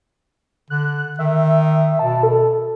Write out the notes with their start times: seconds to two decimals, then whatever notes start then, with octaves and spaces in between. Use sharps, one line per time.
0.70 D3 F#6
1.19 D#3 E5
1.99 B2 A5
2.23 A4